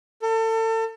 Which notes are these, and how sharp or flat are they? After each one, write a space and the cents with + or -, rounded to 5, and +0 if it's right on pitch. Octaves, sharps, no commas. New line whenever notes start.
A4 +35